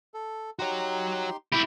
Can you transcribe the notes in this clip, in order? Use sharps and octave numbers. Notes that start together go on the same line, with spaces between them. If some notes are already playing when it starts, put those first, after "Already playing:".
A4
D#4 F#4 G4 C#5 C6
E4 G4 E5 B5